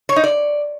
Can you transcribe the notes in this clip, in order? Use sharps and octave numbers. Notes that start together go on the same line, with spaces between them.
C#5
D#4
D5